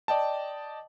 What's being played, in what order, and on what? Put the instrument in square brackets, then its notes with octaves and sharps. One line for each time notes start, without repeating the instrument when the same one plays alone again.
[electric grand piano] D5 D#5 G5 A5